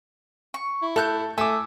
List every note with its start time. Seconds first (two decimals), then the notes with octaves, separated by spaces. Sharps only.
0.54 C#6
0.82 E4
0.96 A3 A4 F#6 G6
1.38 A3 G#5 D6 E6